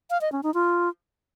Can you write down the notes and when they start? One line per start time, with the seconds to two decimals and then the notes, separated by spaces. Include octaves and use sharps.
0.10 F5
0.21 D#5
0.32 C#4
0.43 D#4
0.54 F4